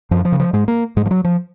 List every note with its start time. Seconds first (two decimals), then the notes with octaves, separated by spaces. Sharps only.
0.11 F#2 F3
0.25 F3
0.32 C#3
0.40 F3
0.53 G#2 G#3
0.68 A#3
0.96 G#2 G#3
1.06 F3
1.11 F#3
1.24 F3